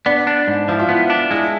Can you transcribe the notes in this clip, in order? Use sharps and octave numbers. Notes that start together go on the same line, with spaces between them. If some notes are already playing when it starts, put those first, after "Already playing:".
B3 D4
D4
G#2
F3 E4
F4
B3 E4
D4
G#3 E4